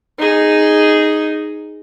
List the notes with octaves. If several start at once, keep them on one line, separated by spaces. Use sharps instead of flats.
D#4 G#4